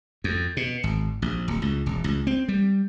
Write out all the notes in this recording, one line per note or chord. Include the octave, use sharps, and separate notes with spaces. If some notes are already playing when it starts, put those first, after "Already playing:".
F2
B2
G#1
A#1
D1
C#2
E1
C#2
C4
G3